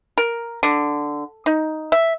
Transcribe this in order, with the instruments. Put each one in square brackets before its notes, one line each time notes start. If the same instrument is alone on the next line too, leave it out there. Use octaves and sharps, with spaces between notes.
[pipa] A#4
D3
D#4
E5